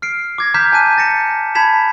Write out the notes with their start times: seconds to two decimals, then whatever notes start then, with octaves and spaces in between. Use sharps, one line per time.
0.02 F6 C7 D7
0.38 D6 G#6 A#6
0.54 A#5 D6 F6 G6 B6 E7
0.72 G#5 A5 F#6 D#7
0.98 A6 A#6 C#7 E7
1.55 A5 B5 G#6 B6 E7 F7